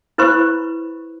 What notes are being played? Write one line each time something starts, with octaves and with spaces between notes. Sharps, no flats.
E4 B4 C5 B5 C#6